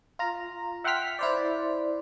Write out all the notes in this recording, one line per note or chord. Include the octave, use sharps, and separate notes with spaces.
F4 A#5
E5 F#5 G5 C6 F6 B6
E4 C5 D5